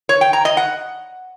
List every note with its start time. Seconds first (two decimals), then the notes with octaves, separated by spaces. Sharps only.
0.09 C#5
0.21 G5
0.33 A#5
0.45 D#5
0.57 F#5